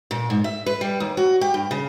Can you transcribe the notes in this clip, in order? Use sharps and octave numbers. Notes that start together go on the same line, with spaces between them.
A#2
G#2
E5
B4
G3
D#2
F#4
G4
G2
C#3